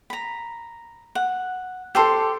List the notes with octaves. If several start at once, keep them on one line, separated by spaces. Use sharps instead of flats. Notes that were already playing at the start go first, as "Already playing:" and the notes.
A#5 B5
F#5
G4 A4 C5 A5 C6 E6